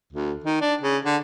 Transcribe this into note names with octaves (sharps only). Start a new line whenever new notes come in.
D2
D#3
D4
C#3
D3